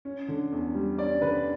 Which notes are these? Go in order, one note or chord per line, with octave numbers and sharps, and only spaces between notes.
C#4
D3
E2
G3
C#4 D5
D3 B4